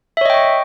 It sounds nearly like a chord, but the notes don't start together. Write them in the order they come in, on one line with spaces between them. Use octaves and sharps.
E5 C#5 D#5 G5 C#6